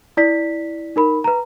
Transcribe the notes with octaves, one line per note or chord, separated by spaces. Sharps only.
E4 D5 B6
D#4 A#4 B5
B4 A#5